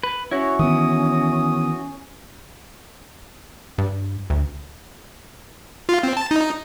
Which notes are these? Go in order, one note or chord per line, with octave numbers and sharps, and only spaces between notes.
B4
C#4 E4 F#4 C#5
D#3 E3 B3 D#6
G2
D2
F4
C4
A5
D#4